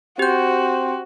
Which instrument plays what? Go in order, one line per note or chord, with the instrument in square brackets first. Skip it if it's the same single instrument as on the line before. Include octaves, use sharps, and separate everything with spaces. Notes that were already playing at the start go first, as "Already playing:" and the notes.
[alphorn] C4 [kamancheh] F#4 [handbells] G4 G6